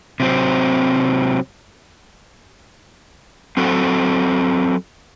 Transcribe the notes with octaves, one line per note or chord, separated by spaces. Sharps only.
C3 F#3 C4
F#3 C4 F#4 A4